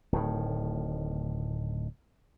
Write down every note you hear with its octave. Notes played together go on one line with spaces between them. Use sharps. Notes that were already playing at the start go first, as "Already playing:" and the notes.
D1 A2 D#3